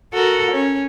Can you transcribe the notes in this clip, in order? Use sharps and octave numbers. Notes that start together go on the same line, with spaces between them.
F#4 A4 A#4
C#4